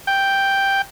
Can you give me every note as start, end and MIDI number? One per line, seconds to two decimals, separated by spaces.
0.07 0.82 79